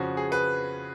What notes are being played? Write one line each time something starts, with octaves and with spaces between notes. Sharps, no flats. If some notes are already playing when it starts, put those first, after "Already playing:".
Already playing: F2 C#3 F3 F#4
G#4
B4